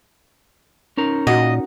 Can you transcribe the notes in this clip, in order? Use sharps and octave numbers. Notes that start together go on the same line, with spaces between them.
C#4 D#4 A#4
A#2 F#4 D#5 F#5